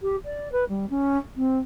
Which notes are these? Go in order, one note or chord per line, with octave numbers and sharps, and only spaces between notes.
G4
D5
B4
G3
C#4
C4